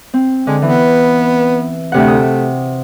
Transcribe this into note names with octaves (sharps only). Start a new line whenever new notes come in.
C4
D3 G#3
E3 B3
D2 C3 A3 F#5
D#6